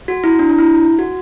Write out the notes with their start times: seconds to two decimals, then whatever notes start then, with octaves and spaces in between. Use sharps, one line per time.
0.08 F#4
0.24 E4
0.39 D4
0.49 D4
0.58 E4
0.99 F#4